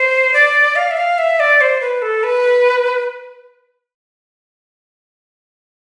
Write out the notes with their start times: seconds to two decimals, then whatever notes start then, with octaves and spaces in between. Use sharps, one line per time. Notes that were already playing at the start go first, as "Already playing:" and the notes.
Already playing: C5
0.34 D5
0.76 F5
0.91 E5
0.97 F5
1.18 E5
1.40 D5
1.61 C5
1.81 B4
2.02 A4
2.23 B4